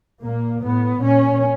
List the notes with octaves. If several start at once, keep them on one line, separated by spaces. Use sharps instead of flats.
A#2 A#3
A2 B3
A#2 C#4